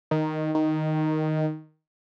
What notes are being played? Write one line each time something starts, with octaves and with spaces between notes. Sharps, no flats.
D#3
D#3